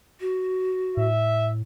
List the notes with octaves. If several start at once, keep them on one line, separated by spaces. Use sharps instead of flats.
F#4
A2 E5